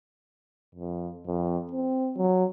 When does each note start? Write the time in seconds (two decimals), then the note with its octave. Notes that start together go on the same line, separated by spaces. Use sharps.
0.75 F2
1.26 F2
1.72 C4
2.17 F#3